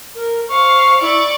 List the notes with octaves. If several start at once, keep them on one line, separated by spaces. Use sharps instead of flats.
A#4
C5 F5 C#6
E4 D5 C#6